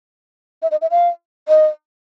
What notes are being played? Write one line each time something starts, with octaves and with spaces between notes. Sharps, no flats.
E5
D#5
E5
F5
D#5